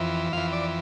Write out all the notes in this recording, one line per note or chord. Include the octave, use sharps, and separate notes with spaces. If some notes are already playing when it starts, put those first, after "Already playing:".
Already playing: F2 E3
F2 E3 F5
D5